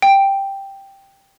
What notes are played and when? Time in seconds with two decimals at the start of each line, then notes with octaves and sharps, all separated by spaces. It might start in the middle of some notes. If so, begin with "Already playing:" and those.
0.02 G5